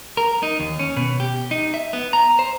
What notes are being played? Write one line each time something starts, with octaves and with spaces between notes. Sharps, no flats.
A#4
D#4
D#2
C#4
B2
G4
D#4
E5
B3
A#5
C5